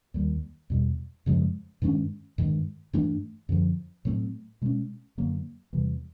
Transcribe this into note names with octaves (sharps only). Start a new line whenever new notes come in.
D#2 D#3 G3
E2 B2 G3
F#2 C#3 F3 G#3
G2 D#3 G#3 C#4
G2 D#3 G#3
G2 E3 A3 D4
F#2 D3 F3
A2 F#3 A3 C4
B2 G#3 C#4
F#2 D3 F#3 A#3
E2 C3 E3 G3